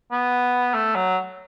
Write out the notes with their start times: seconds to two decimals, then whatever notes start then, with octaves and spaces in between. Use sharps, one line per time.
0.11 B3
0.74 A3
0.95 F#3